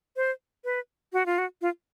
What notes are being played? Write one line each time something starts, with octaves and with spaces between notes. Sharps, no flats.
C5
B4
F#4
F4
F#4
F4